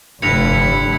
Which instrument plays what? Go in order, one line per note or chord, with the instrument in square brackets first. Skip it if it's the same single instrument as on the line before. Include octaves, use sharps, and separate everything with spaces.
[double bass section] F1 D3 [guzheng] G2 [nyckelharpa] E4 [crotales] C#7 F7